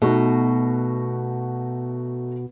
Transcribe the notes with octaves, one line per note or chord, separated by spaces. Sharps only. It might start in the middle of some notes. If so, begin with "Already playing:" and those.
B2 A3 D#4 F#4